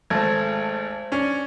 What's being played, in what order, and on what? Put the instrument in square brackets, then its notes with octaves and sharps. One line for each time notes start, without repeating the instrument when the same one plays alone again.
[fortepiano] G#1 A3 [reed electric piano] C5 A5 G#6
[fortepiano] C#4 D4